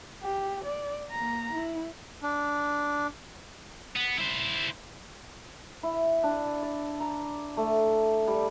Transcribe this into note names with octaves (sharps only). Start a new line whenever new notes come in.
G4
D5
A#3 A#5
E4
D4
B3
E4 C5
E4
D4
D5
A#5
A3
G3